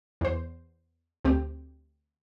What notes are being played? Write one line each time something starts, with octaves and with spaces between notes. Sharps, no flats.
E2 C5
D2 C4 G4